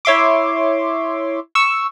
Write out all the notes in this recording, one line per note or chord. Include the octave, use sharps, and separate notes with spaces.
E4 C#5 E5 C6 D6
C#6 E6